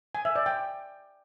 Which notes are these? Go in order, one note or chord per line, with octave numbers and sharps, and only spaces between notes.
G#5
E5
D5
G5